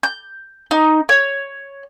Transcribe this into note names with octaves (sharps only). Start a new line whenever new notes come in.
G6
D#4
C#5